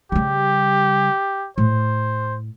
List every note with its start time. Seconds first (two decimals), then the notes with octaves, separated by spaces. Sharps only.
0.12 C#3 G3 G4
1.58 A2 C5